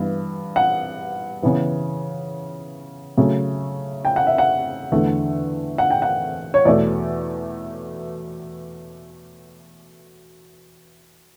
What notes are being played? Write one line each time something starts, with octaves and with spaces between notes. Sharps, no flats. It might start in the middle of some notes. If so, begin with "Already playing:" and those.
Already playing: G2 E3 B3
F#5
C#3 E3 B3
C#3 F#3 A3
G5
F#5
E5
F#5
E2 D3 A3
F#5
G5
F#5
C#5
E2 B2 A3 D5